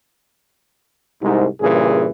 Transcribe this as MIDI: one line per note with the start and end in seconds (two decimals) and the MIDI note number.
1.22 1.46 36
1.22 1.46 44
1.61 2.09 43
1.61 2.09 46
1.61 2.09 49
1.61 2.09 52
1.61 2.09 68